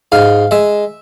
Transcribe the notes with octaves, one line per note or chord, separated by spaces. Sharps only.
G#2 F5
G#3 E5